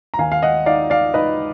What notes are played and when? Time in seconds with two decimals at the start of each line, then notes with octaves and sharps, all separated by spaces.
0.14 A#5
0.18 D#2 F5 G#5
0.32 F5
0.42 D#5 F#5
0.66 D#4 D5 F5
0.90 D5 F5
1.14 D#4 B4 D#5